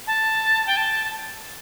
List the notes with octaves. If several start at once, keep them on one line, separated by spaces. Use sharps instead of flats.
A5
G5
A5